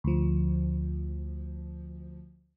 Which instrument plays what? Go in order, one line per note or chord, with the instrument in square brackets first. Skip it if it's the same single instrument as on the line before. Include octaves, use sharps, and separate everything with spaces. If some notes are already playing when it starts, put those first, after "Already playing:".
[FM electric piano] D2 F3